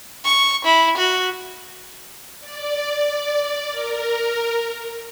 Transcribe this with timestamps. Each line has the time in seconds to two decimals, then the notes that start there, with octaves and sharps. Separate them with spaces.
0.25 C#6
0.65 E4
0.97 F#4
2.40 D5
3.70 A#4